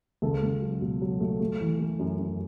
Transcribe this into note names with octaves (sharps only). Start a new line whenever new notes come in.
C#2 A4
C#2
F#3
B2
F#3
A3
A3
E3
A3
F#2
F#2